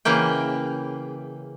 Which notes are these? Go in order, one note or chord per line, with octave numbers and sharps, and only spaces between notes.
C#3 E3 A#3 G5